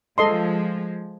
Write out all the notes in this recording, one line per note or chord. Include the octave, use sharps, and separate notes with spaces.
F3 G#3 A4 D#5 C6